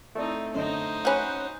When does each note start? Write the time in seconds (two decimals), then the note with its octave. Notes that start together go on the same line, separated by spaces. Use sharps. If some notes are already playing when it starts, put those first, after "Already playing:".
0.15 A3 C4 D#4 E4 A4 D5
0.54 F#2 D3 D#4 C5 D#5
1.05 C#4 F#4 B5 F#6 G6